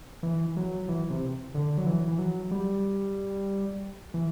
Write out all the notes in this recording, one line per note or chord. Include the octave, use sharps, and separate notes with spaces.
E3
F#3
E3
C3
D3
F#3
E3
E3
F#3
G3
E3